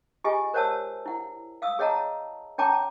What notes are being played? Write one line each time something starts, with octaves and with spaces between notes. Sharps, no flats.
F4 G4 G#4 D#5 G#5
A#4 C5 C#5 F#5 A5 E6
E4 F#5
F5 D#6 E6
G#4 C#5 D#5 F#5 A5 A#5
C#4 C#5 G5 A5 A#5 D6